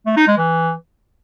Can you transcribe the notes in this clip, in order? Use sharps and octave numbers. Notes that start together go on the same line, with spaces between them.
A3
D#4
G#3
E3